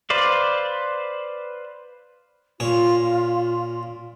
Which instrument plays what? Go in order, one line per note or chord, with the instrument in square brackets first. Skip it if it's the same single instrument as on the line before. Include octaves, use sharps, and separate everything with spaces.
[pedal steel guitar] B4 C5 D5 F5
[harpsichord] A#2 C#5 [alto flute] F4